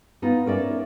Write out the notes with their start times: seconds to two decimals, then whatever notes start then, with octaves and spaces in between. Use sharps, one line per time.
0.22 B3 D#4 F4
0.46 C#4 A#4 D5 E5